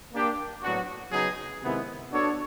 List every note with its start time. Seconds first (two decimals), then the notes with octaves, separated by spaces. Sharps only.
0.11 A#3 D4 G4
0.62 A2 F#3 B3 D4 F#4
1.11 C#3 F#3 B3 D#4 G#4
1.61 C3 D#3 G#3 B3 E4
2.10 B3 D4 F#4 A4 C#5